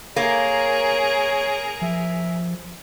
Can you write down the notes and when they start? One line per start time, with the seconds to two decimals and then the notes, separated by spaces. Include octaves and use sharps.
0.16 A#3 G#4 A#4 C#5
1.82 F3 E5